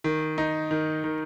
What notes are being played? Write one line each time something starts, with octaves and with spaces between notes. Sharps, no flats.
D#3
D#4
D#3
D#3